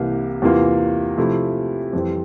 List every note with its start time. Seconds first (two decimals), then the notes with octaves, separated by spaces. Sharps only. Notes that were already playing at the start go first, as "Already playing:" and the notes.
Already playing: C2 C3 E3 A#3
0.42 E2 C3 E3 A#3 F4
1.17 C3 F3 A3 E4
1.93 F2 E3 G3 C4